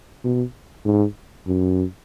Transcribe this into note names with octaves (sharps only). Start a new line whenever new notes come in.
B2
G#2
F#2